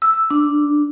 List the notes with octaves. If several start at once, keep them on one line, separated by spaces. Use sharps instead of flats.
E6
D4